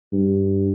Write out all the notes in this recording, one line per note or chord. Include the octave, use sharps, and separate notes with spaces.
G2